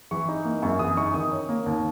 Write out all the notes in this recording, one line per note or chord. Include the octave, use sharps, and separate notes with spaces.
E3 C#6
D#4
A#3
F#2 C#6
E3 D#6
D#4 C#6
D#3 D#6
C#4
A#3
D#2